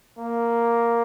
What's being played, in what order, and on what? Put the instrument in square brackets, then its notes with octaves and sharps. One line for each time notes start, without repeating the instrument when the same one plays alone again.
[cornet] A#3